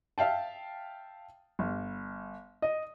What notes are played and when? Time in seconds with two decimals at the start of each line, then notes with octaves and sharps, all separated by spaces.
0.18 E5 F5 G5 A5
1.59 G1
2.62 D#5